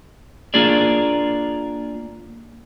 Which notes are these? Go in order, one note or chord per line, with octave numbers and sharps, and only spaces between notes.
A#3 D4 F4 G#4 D5